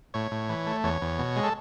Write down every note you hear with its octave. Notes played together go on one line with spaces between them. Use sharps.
A2 C#5
A2
E3
A3
E2 C#5
E2
B2
G#3
A4